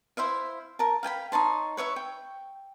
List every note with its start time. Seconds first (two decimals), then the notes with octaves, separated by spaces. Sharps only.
0.17 E4 C5 E5 F5
0.79 A#4 A5
1.03 F5 G5 G#5 B5
1.32 D#4 C#5 A5 C6
1.77 B4 C#5 E5 C#6
1.96 G5